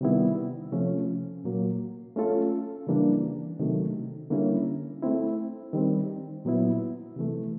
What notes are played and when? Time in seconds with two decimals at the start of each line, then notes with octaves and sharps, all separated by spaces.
0.01 C3 D#3 G3 B3 E4
0.72 C3 F3 A3 C#4
1.44 A#2 F#3 A#3
2.16 A3 C#4 F4 A4
2.87 C#3 E3 G3 A#3 D4
3.59 C3 D#3 F#3 A3
4.30 D3 G3 A#3 C#4 E4
5.03 A3 C4 E4
5.73 D#3 G3 C4
6.45 A#2 F#3 B3 E4
7.16 C3 E3 A3